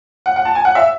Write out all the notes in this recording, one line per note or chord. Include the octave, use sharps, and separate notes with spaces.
F#5
F#5
A5
G#5
F#5
E5